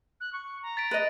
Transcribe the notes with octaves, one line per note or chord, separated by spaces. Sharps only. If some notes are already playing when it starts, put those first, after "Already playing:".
F#6
C#6
A#5
A6 B6 D7
B4 D#5